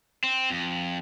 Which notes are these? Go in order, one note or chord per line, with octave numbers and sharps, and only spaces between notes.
C4
F2